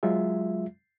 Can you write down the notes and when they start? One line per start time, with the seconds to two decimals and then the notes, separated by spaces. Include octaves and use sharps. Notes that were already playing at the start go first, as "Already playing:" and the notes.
0.03 F#3 G#3 F4 E5